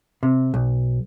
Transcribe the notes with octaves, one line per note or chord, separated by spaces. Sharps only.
C3
B1